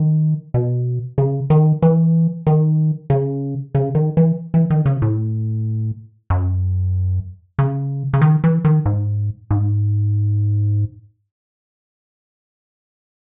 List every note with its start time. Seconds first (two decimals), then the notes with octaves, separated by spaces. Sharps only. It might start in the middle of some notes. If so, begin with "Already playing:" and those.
Already playing: D#3
0.54 B2
1.18 C#3
1.50 D#3
1.82 E3
2.47 D#3
3.10 C#3
3.75 C#3
3.95 D#3
4.17 E3
4.54 E3
4.70 D#3
4.86 C#3
5.02 A2
6.30 F#2
7.59 C#3
8.13 C#3
8.21 D#3
8.44 E3
8.65 D#3
8.86 G#2
9.50 G#2